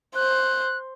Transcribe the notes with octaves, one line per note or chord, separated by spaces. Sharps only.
C5 F#6